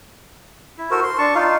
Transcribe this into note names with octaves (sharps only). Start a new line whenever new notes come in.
E4
F#4 A4 A#4 C5
C6
D4 A5 C#6
D#4 F4 F5